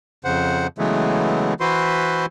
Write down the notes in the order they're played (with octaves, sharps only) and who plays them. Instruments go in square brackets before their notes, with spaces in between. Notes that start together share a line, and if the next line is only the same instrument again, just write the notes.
[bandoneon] F2 C#3 C5 F#5
C#3 E3 F#3 G#3 A3 B3
E3 E4 F#4 B4 C5 C6